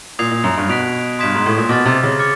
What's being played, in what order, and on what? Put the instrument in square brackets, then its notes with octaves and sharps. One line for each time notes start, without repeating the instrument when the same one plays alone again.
[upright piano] A#2 [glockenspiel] D#6 G#6 C7 F7
[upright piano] A#2
F#2
G2
[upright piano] B2 [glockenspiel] F#6 B6 D7 F7
[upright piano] G2 [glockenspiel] C6 D#6 G#6 B6 E7
[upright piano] G#2
A2
A#2
[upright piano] B2 [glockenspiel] D6 F6 A6
[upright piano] C3
C#3
[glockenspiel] D6 F6 A6 C#7